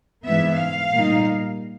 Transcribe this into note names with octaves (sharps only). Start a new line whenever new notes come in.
G#2 E3 G#3 B3 E5
F5
A#2 G3 A#3 D#4